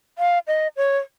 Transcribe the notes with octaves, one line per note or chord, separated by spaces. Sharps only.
F5
D#5
C#5